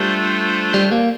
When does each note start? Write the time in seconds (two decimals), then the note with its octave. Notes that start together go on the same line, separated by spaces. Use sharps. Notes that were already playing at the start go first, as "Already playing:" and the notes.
Already playing: G3 A3 D4 F4 A4 C5
0.74 G3
0.92 A#3